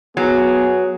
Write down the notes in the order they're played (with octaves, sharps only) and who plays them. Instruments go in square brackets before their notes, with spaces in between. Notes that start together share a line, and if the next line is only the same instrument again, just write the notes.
[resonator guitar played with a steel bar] F#3 [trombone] B3 [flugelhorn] G#4